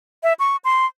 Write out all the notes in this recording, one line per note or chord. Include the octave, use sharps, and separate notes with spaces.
E5
C#6
C6